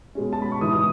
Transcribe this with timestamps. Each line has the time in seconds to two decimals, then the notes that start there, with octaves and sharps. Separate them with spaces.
0.15 B2 G#3 C#4
0.33 A5
0.42 B5
0.52 C#6
0.61 G#2 E3 B3 D#4 D#6
0.73 D#6